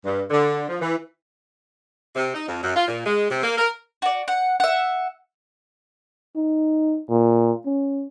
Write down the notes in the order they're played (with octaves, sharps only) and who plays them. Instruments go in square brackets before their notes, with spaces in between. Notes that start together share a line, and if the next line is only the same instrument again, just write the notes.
[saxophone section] G2
D3
F3
E3
C3
D#4
F2
F#2
F4
A#2
G#3
C3
A#3
A#4
[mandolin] F#4 D5
F#5
E5 F#5
[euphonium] D#4
A#2
C#4